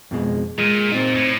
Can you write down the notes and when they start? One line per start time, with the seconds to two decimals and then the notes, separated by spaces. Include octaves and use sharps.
0.11 F2 B2 G#3
0.58 A#2 G#3
0.92 C4 D#4
1.16 A2